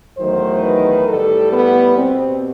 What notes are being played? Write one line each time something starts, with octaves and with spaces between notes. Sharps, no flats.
E2 D#3 F#3 A3 C5
B4
A2 G3 A4
B3
B2 G3 C4